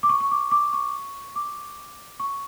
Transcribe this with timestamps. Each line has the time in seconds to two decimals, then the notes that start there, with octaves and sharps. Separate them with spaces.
0.03 D6
0.09 C#6
0.20 C#6
0.31 D6
0.51 D6
0.73 C#6
1.36 D6
2.20 C#6